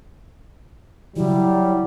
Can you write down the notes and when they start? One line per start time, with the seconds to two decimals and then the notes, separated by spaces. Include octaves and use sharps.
1.16 C#3 E3 F#3 G3 E4